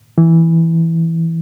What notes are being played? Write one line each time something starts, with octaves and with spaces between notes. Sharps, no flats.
E3